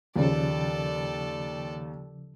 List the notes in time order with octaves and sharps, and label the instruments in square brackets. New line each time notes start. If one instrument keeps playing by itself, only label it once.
[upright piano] D#2 [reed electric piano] C#3 F3 [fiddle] A4 D5